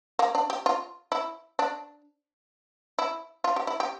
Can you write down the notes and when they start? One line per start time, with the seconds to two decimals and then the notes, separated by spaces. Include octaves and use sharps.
0.19 A#3
0.35 D4
0.50 G4
0.66 F4
1.12 E4
1.59 D4
2.99 E4
3.44 F4
3.56 G4
3.67 E4
3.80 G4